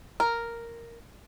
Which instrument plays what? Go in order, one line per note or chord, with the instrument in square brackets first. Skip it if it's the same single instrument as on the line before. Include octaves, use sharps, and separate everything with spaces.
[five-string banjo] A#4